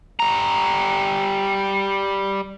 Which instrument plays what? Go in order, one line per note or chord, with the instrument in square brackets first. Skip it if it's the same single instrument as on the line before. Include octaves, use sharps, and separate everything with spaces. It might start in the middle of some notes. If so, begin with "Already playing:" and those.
[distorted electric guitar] G3 A#5